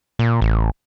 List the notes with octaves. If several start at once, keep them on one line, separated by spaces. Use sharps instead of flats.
A#2
A1